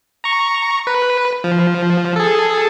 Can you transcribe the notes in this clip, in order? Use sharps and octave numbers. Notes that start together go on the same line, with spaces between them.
A#5 C#6
B4
F3
G#4 A4